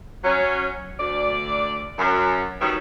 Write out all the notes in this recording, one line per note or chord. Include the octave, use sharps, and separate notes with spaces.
F#3 C#4
D2 D5
F#2
D#3 F#3 G3 B3 C#4 E4